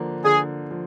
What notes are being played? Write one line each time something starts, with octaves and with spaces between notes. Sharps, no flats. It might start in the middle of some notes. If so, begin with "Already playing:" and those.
Already playing: D3 F3 A#3
D3 G#4
F3